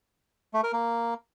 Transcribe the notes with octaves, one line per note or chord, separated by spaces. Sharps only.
A3
A#4
A#3